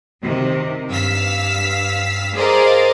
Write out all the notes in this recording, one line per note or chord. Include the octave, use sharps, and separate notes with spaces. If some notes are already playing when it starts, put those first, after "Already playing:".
C3 D#3
G2 F5 E6 B6
G#4 A#4 C5 D5 D#5 F5